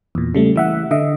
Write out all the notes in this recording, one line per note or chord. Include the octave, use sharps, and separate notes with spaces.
E2 A#2
C#3 G3 A3
E3 E5 F#5
D3 D#5 E5